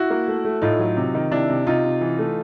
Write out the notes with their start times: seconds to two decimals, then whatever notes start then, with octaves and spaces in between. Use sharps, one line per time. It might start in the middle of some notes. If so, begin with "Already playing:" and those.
Already playing: E4 F#4
0.10 A#3
0.28 A3
0.45 A3
0.62 A2 D#4 F4
0.79 F#3
0.97 C3
1.15 D#3
1.31 C3 D4 E4
1.50 C3
1.67 C3 D#4 F4
1.84 C3
2.01 E3
2.19 A3